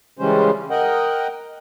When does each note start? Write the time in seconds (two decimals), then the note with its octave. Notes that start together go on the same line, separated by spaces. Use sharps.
0.19 C#3 E3 G3 G#3 C#4 C5
0.71 A#4 D#5 F#5 G5